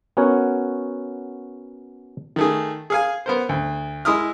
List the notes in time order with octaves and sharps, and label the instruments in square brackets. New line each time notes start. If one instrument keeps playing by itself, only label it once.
[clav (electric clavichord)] B3 C#4 F#4 A#4 C#5
[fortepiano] D#3 A3 G#4
G#4 F5 G#5
B3 A#4 C5
D2
G#3 E4 D#6 F6